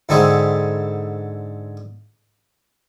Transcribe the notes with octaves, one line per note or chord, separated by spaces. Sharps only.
G#2 D3 G#3 C4 E4 G#4